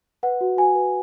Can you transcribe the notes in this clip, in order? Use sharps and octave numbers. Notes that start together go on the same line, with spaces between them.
B4 F#5
F#4
F#4 G#5
B4